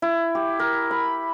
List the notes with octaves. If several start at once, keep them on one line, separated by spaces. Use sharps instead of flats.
E4
G4
A#4
B5